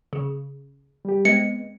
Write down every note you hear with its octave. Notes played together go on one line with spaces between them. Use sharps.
C#3
G3 G4
G#3 B3 C4 C#7